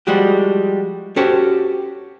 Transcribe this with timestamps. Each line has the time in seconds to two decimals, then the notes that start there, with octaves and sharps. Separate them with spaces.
0.07 F3 G3 G#3 F#4 G4
1.16 C#4 F#4 G4 A4 C5 C#5